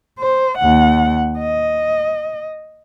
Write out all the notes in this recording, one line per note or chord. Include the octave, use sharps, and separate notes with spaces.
C5
D#2 F#5
D#5